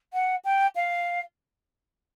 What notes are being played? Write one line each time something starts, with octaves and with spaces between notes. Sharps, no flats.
F#5
G5
F5